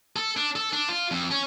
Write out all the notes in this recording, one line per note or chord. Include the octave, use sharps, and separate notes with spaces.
A4
D4
A4
D4
F4
F2
C#4